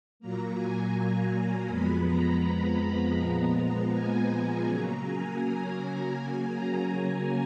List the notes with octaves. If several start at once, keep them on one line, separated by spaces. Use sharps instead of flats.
A#2 F#3 A#3 A#5
G#5
A#5
F2 F3 G#3 B3 B5
A#5
A#2 F3 G#3 B3
G#5
A#5
C#3 F#3 A#3 A#5
G#5
G#5
C#3 F#3 A#3 G#5
A#5
A#5